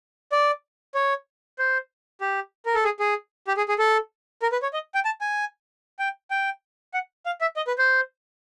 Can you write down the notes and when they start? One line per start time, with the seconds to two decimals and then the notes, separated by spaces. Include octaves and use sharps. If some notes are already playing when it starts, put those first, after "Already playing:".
0.32 D5
0.95 C#5
1.59 C5
2.21 G4
2.66 A#4
2.75 A4
2.84 G#4
3.00 G#4
3.48 G4
3.57 G#4
3.69 G#4
3.79 A4
4.42 A#4
4.52 B4
4.62 C#5
4.73 D#5
4.95 G5
5.05 A5
5.21 G#5
5.99 G5
6.31 G5
6.94 F#5
7.26 F5
7.41 E5
7.56 D#5
7.67 B4
7.78 C5